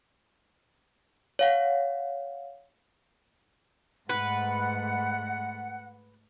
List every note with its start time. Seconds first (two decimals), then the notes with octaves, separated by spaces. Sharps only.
1.39 C#5 F5 F#5
4.09 G#2 A3 B4 F#5